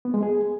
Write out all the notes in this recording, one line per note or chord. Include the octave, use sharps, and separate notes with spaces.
B3
G#3
G#4